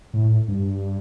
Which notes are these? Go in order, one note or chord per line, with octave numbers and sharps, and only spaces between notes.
A2
G2